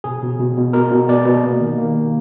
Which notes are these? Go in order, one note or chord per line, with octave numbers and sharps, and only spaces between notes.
B2 G#4
B2
B2
B2
B2 A#4
B2
B2 D5
B2
A#3
D#3
A#3